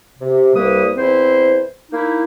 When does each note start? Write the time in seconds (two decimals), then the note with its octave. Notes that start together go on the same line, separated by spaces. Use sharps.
0.20 C3
0.55 C2 G3 A#3 B4 D#6
0.97 E2 C4 E4 C5
1.92 A#3 D#4 E4